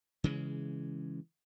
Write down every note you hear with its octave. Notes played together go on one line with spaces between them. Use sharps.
C#3 E3 G#3